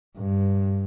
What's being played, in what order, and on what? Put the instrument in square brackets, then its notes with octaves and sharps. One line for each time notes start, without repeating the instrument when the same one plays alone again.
[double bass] G2